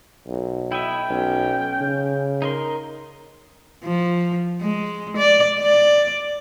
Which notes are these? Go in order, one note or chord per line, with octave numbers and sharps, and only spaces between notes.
B1
E4 D#5 E5 G5
B1 C#4
C#3
D#4 A#4 C6
F3
G#3
D5
D5